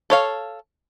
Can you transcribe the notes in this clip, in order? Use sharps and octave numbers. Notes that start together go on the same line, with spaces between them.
A4 C#5 F5